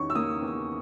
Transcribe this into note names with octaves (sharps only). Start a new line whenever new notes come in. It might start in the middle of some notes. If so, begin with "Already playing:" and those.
Already playing: E2 D#3 C#4 C#6
E6
A#3 D#6
E2